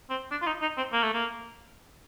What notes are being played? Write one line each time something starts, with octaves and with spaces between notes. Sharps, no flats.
C4
D4
F4
D#4
D#4
C4
A#3
A3
A#3